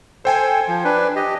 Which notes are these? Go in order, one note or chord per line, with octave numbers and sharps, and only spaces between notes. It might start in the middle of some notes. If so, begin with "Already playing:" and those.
A4 C5 G5 G#5
F3
D4 B4
G4 D#5